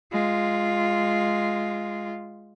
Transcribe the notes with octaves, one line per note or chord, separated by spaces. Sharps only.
G#3 F4